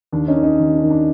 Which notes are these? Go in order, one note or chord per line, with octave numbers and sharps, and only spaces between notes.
D#2 D4
C#4 D#4
D#3
C#4 D#4
D#2
D4
D#3
D4